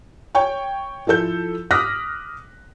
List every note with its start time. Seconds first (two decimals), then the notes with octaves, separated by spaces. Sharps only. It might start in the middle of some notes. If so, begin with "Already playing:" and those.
0.35 C#5 G5 C#6
1.07 F3 E4 A4 G6
1.71 D6 D#6 F6 F#6 A#6 B6